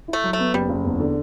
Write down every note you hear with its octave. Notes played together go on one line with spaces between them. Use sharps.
E4
A3
F#3
A3
B3
F#1 G3
F#1
E2
D3